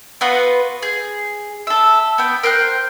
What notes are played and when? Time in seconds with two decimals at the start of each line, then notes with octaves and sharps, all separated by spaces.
0.21 B3 F4 F#4 B4
0.82 G#4
1.67 A4 E5
2.18 B3 G5
2.43 A#4 C5 G5 F#6